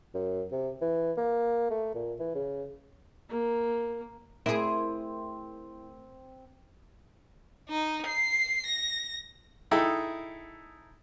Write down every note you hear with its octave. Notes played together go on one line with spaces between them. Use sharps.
F#2
C3
E3
A#3
A3
A#2
E3
C#3
A#3
A3 C4 E4 G#4 A#4 D7
D#4
C7
A#6
D#4 E4 G#4 A4 G5